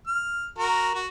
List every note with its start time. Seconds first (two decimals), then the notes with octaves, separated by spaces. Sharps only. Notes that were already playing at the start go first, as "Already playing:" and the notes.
0.07 F6
0.58 F#4 A#4
0.94 F#4